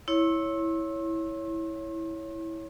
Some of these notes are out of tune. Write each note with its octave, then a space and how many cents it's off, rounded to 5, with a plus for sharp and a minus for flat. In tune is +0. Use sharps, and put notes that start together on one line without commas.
E4 -10 C#5 +0 C6 +45